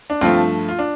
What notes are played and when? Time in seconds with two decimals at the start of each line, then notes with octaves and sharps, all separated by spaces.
0.10 D4
0.21 G2 F3 A3 C4 F4
0.69 F4
0.79 D4